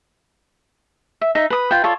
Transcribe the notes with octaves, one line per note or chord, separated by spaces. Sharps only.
E5
D#4 E5
B4 D#6
F4 B4 G5
F4 A4 C#5 D5